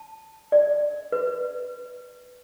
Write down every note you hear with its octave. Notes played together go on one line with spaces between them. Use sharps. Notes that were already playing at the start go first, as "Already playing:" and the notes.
Already playing: A5
D5
B4